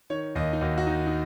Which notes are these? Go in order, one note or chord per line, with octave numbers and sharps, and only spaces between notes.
D#3 C#5
D#2 D#5
D#4
D#2 F#4
F#4
D#3 D#4
D#4